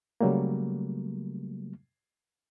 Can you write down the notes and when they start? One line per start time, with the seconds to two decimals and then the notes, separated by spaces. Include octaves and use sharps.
0.21 C#3 F#3 G3 A3 A#3